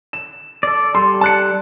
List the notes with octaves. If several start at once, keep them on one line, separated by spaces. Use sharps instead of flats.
E7
A4 D5
G3 A4 C6
A5 F#6 C#7